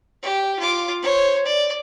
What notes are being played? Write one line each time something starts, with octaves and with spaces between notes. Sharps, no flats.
G4
F4 D6
C5 C#5
D5